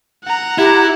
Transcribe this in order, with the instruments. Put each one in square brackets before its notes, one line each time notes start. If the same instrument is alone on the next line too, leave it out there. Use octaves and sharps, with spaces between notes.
[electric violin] F#5 A#5
[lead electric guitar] E4 [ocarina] G4